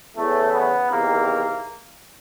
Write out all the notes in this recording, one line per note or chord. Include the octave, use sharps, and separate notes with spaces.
E2 C#3 E3 A3
B3
E2 C3 D#3 A#3